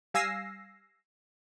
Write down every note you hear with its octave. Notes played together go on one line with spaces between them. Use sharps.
G3 F5 G#5 E6 A#6 C7